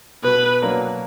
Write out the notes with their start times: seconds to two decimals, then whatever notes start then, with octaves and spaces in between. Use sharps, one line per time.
0.23 B2 B4
0.62 F#3 A#3 D4 A#4